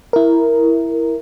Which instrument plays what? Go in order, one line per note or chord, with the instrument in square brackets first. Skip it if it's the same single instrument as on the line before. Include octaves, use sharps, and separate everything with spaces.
[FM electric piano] E4 A#4